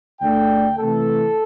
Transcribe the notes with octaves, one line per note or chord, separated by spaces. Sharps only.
D2 D3 A3 D4 G5
C3 E3 A3 A4